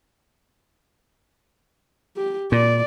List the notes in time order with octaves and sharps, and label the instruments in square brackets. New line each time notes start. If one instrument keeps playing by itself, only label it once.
[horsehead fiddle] G4
[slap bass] A#2 [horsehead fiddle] D5